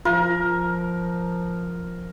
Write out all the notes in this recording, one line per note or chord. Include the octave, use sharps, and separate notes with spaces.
F3 F4 A#4